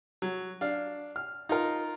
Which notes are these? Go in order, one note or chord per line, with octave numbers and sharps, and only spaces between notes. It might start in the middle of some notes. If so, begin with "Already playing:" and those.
F#3
D4 F5
F6
D#4 F4 A#4